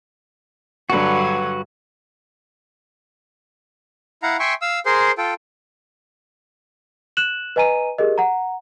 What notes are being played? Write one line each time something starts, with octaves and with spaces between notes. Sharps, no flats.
G2 D3 F#3 F#4 B4
E4 F5 F#5 A#5
E5 G5 G#5 C6 C#6
F5 E6
G#4 A#4 C5 C6
F4 A4 G5
F#6 E7 F#7
B4 D#5 G#5 A#5 D#7
G4 G#4 A#4 D#5
F#5 A#5